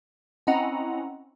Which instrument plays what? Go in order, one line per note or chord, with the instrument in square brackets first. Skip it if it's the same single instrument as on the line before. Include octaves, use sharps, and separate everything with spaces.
[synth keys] C4 C#4 E4 D#5 F#5 A#5